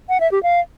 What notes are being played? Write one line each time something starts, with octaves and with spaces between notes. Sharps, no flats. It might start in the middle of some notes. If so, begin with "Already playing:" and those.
F#5
E5
G4
F5